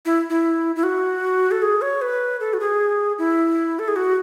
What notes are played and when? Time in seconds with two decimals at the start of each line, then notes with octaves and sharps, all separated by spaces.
0.05 E4
0.30 E4
0.76 E4
0.83 F#4
1.51 A4
1.62 G#4
1.82 C#5
2.02 B4
2.40 A4
2.54 F#4
2.60 G#4
3.18 E4
3.79 A4
3.88 G#4
3.96 F#4